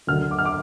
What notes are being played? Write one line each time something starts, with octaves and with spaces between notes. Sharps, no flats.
D2 D3 F#3 F6
D6
F6
D6